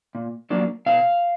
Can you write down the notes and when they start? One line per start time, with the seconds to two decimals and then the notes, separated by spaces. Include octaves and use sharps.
0.15 A#2
0.50 F#3 A#3 D4
0.86 B2 F5